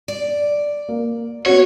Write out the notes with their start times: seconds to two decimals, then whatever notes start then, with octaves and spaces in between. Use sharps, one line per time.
0.08 D5
0.89 A#3
1.46 B3 F#4 C#5